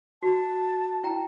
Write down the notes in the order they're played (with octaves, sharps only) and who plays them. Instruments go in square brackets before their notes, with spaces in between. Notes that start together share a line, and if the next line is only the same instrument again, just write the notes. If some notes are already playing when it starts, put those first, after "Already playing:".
[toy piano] F#4 [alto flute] A5
[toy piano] E4 G5 A#5